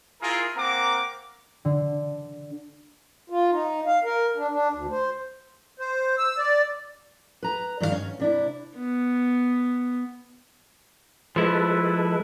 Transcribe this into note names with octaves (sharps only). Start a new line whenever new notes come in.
E4 F4 G#4 A#4
A#3 C4 A#4 F#5 A#5 D6
D3
F4
D#4
F5
A#4
D4
D4
D2
C5
C5
E6
D5
B4 A#5
G2 D#3 E3 F#4 F5
C#4
C3 D4 E4
B3
F3 G#3 E4 A4 B4